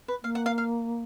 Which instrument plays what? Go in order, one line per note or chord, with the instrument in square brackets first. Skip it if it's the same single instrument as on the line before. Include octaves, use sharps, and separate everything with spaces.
[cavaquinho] B4
[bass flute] A#3 [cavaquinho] F5
[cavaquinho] F#5
F5
F5